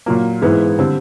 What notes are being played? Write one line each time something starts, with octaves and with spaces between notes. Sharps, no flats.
A#2 F#3 A#3
G#2 E3 G#3 B3 E4
D3 G3 C4